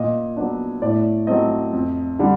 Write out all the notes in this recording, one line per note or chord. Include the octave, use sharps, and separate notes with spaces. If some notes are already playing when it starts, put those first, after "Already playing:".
Already playing: A#2 D#5
F#3 B3 D4
A2 D5
F#3 A3 C4 D#5
F2
D3 G3